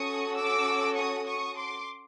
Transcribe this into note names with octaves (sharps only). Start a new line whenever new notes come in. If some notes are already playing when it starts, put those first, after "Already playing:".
Already playing: C#4 F#4 A4 C#6 D#6
D6 E6
C#6 D#6
C#6 D#6
C6 D6